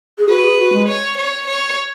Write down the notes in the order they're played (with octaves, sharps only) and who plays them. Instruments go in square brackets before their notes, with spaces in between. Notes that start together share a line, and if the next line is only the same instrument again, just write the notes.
[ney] G#4
[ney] F#4 [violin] B4
[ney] G#4
F#4
G#3
[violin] C#5
C#5
C#5